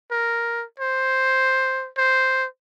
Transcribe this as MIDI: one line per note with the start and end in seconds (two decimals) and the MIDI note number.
0.11 0.64 70
0.80 1.89 72
1.98 2.47 72